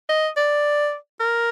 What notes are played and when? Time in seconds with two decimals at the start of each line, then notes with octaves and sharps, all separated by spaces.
0.09 D#5
0.37 D5
1.20 A#4